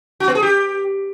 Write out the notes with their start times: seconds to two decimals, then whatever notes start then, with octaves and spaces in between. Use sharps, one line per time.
0.20 F#4
0.28 B3
0.35 G#4
0.42 G4